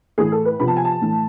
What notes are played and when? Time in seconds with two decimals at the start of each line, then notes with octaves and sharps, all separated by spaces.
0.18 A2 E3 A3 G#4
0.32 A4
0.45 B4
0.60 C3 F3 B3 B5
0.68 A5
0.76 G#5
0.85 A5
1.01 A2 E3 A3